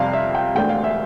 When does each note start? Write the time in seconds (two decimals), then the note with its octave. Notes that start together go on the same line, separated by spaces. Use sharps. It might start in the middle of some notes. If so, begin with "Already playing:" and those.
Already playing: F2 C3 G3 C4 F5
0.13 E5
0.35 G5
0.55 E1 D2 D3 A3 G5
0.69 F5
0.84 E5